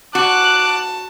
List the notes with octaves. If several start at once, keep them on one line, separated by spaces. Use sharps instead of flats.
F#4 A5 D6 F#6